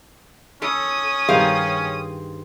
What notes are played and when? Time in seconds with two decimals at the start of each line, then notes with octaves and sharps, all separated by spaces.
0.62 C#4 A4 D#6
1.28 G2 D#3 C4 G#4 F5